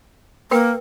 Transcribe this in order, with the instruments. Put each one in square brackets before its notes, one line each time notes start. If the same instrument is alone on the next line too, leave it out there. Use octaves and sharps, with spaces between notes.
[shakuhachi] A#3 [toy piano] A#4 B4 G5